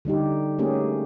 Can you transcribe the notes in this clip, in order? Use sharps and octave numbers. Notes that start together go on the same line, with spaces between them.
D3 G3 D#4 G4
A3 A#3 C#4 G4 G#4